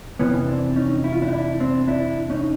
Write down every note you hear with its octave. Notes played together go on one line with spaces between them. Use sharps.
F2 C3 E3 B3 C#4
C4 D4
C#4 D#4
E4
F4
D4 E4
D#4
D4 E4
C4 D4
D4 E4
C#4 D#4